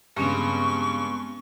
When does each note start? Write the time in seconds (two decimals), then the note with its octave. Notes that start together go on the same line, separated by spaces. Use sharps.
0.17 G2 C#3 G#3 B3 C4 C#6